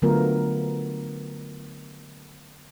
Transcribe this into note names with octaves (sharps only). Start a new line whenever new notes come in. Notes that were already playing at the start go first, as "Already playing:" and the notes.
D3 F#3 A3 B3 F4 A#4